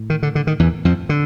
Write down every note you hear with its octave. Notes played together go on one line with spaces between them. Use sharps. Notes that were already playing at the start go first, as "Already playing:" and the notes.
Already playing: A2
D#3
D3
D3
D#3
E2 E3
F2 F3
D3